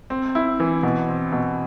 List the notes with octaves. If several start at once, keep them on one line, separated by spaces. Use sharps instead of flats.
C4
E4
E3
B2
C4
B2